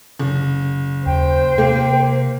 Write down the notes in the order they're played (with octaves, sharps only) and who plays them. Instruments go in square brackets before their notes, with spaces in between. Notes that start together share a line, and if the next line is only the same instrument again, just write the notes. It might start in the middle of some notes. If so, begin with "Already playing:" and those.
[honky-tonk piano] F#1
[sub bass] D#2 [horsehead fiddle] C5 [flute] G5
[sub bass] C3 [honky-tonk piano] A#3